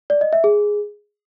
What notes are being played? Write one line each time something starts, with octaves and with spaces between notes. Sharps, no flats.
D5
D#5
E5
G#4